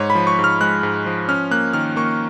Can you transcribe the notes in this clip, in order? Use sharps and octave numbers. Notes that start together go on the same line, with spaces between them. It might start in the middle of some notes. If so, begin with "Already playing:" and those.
Already playing: G#2 C#5
B5
F3
C#6
G#2
F6
G#3 F#6
G#2
F3
C#4 F6
A#3 F#6
D#3 F6
A#3 C#6